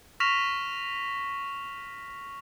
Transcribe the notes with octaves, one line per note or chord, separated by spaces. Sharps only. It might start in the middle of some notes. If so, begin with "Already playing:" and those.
C#6 F6 A#6 B6 E7 F7